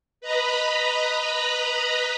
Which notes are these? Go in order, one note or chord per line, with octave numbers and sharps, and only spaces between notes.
B4 D#5 A#5 B5